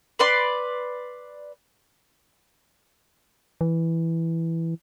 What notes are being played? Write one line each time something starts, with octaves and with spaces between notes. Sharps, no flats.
B4 D5 C6
E3